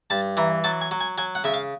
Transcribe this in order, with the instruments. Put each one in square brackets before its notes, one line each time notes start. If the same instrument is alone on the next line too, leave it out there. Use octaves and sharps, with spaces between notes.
[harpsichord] G2 A5
E3 A#5
F#3 A5
G#5
F#3
G#5
F#3 G#5
F#5
C#3 E5
F5